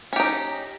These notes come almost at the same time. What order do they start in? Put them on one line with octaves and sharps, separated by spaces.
C#4 G4 D#4